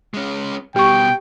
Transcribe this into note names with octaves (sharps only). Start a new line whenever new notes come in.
G#3 C#4
B2 G3 G4 G5 C#6